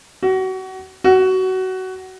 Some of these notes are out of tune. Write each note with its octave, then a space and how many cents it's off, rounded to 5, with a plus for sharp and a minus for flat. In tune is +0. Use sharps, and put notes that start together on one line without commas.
F#4 +30
F#4 +20